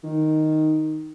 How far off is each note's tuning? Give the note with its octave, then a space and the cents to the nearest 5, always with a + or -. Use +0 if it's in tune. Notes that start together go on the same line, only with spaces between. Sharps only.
D#3 +0